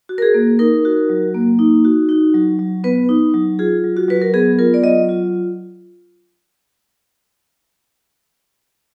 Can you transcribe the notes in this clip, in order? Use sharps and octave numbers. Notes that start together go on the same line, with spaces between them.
F#4
A#4
G#4
A#3
D#4 A#4
F#4
F#3
A#3
D#4
F#4
D#4
F#3
F#3
B3 B4
D#4
F#3
F4 G#4
F#3
F#4
F#3 B4
A#4
B3 G#4
F4 A#4
D5
F#3 D#5
F4